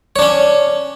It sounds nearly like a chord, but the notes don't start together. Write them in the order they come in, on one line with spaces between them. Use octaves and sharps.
C#5 D4 C#4